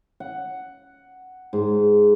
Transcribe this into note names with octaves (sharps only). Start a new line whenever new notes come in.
F#5
G#2